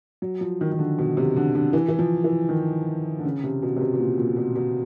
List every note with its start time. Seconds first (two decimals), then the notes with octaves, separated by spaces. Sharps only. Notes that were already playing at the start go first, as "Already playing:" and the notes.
0.22 F#3
0.41 F3
0.61 D#3
0.72 D#3
0.79 D3
0.99 B2
1.17 C3
1.36 D3
1.55 D3
1.73 E3
1.88 E3
1.99 F3
2.24 E3
2.49 D#3
3.19 D3
3.25 C#3
3.44 C3
3.62 B2
3.76 C3
3.81 B2
3.94 B2
3.99 A#2
4.18 A#2
4.37 B2
4.56 B2